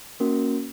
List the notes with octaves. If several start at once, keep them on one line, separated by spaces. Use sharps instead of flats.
A#3 C#4 F#4 A#4